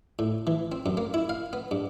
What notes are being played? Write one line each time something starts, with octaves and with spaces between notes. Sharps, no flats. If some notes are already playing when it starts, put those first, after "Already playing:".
A2
E3
C4
F#2
A#3
E4
F5
B3
G2